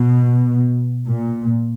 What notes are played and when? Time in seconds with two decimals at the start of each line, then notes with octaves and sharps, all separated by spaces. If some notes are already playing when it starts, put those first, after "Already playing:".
Already playing: B2
1.08 A#2